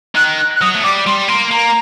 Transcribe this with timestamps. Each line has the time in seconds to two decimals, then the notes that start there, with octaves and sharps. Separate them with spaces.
0.15 D#3 F#6
0.37 F#6
0.56 F#6
0.61 F#3 D#6
0.74 A3
0.84 G3 D6
1.06 G3 C6
1.28 A#3 C6
1.51 A#3 A#5